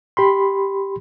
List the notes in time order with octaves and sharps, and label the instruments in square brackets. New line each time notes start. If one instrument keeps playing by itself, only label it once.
[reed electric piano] G4 B5 C6